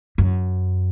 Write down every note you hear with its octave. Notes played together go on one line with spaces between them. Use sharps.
F#2